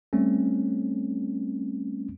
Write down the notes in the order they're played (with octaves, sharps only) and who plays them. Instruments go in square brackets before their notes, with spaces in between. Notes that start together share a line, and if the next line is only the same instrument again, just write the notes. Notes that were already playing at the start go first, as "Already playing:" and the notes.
[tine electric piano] G3 A3 C4 C#4